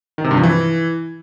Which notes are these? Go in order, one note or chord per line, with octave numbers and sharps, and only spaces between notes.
D#3
C3
G2
F3
E3